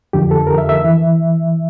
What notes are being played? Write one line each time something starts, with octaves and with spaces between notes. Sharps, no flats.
F2 D3 F3 G4
A4
A#4
E5
E5
E3